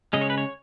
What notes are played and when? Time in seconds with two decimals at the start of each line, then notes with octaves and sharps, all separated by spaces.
0.13 C#3 G#3 C#4 D#5
0.21 C#5
0.30 B4
0.38 C#5